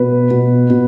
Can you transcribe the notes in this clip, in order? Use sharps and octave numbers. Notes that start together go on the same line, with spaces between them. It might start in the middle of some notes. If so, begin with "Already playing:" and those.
Already playing: B2 B4
B2
B2